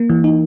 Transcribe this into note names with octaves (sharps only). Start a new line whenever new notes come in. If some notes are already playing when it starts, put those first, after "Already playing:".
Already playing: A#3
E3
D#4